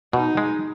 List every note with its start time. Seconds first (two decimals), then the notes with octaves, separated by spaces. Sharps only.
0.13 B2 D#4
0.37 G#3